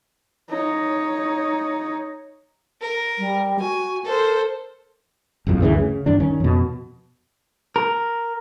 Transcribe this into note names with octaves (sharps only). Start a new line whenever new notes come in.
D#4 C#5
A#4
G3
F#4 G#5
A4 A#4 C5
F#1 B1 F2
D2 G2 C#3 E3
C#3
G2 D#3 D4
D#3 C#4
F2 B2
A#4